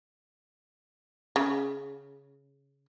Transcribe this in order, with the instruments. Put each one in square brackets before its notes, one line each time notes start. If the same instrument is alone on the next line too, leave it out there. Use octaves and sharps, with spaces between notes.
[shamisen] C#3